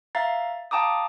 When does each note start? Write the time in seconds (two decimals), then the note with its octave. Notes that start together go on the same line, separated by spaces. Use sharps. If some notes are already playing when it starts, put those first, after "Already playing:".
0.15 E5 F5 A#5 A6 C7
0.71 F5 G5 A5 A#5 D6 D#6